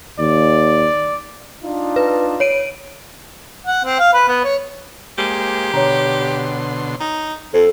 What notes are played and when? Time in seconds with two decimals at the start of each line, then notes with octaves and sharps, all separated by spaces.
0.20 D#2 D5
1.63 D4 D#4 F4
1.96 B4
2.40 C#5 D7 D#7
3.66 F#5
3.84 C4
3.99 F5
4.13 B4
4.28 B3
4.44 C#5
5.18 G#3 A#3 G4 C5
5.73 B2 D3 C#5 A#5 C6
7.00 D#4
7.54 F2 A4 C5 C7